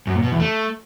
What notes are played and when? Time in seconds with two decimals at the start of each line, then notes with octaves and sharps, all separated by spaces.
0.07 F#2
0.15 A#2
0.23 B2
0.32 E2
0.40 A3